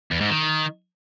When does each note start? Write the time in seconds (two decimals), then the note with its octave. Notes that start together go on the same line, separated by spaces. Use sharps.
0.11 E2
0.21 G#2
0.30 D#3